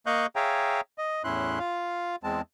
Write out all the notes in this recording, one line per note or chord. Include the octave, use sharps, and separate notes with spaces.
A#3 D#5 F5 C#6 F#6 G6
G#4 C#5 E5 F5 G5 A#5
D#5
E2 A2 C#4 E4 C6 F#6
F4 F5
E2 G#3 C4 A5